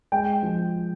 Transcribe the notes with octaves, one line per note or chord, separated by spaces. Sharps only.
G#3 G5
F3